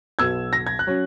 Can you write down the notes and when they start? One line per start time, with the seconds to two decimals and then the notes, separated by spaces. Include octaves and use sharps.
0.19 B1 B2 F#3 B3 E6 G#6
0.53 A#6
0.67 G#6
0.79 F#6
0.87 F#3 C#4